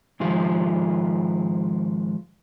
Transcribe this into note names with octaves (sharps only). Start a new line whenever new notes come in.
G#2 D#3 F3 G#3 F4